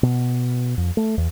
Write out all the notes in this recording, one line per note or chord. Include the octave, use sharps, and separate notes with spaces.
B2
F2
A3
E2